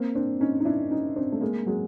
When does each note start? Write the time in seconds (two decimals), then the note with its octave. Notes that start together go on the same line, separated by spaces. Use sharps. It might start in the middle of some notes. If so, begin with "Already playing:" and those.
Already playing: A#3 C4
0.15 C4 D4
0.40 C#4 D#4
0.60 D#4
0.65 D4 E4
0.91 C#4 D#4
1.16 C4 D4
1.32 A3
1.41 G#3 A#3
1.66 F#3 G#3